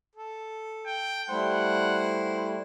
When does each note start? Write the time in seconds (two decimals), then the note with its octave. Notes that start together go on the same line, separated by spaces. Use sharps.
0.16 A4
0.86 G5
1.30 G3 A3 E4 C5 F#5